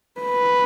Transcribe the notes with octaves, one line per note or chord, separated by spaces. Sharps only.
B4